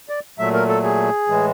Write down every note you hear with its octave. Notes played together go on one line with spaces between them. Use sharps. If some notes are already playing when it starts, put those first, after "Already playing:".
D5
A#2 F#3 A3 E5
A#4
A4
G#4
A2 E3 G#3